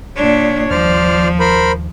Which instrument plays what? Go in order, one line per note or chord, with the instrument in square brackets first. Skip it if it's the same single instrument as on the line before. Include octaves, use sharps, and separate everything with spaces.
[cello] A#2 D4 [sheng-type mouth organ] C#5
[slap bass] D#2 G3 [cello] F3 [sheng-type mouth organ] C5 D5 F6
[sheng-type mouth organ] A#4 C5 B5